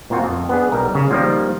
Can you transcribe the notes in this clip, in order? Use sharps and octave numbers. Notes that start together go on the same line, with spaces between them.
A#2 C4 F4 F#4
F2
B3 D4 G#4
B1 G3 A#4
C#3
D#3 F3 G3 A#3 F4